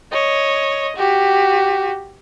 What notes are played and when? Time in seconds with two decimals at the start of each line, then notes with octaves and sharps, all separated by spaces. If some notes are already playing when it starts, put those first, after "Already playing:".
0.12 C#5 D#5
0.96 F#4 G4